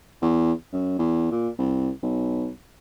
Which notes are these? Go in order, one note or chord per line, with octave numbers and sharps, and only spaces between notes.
E2
F#2
E2
A#2
C2
B1